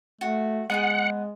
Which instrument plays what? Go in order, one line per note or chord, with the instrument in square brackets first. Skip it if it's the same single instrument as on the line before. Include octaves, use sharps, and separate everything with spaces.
[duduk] A3 [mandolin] F#4
[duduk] G#3 [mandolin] B3 D#4 G#4 [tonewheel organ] F#5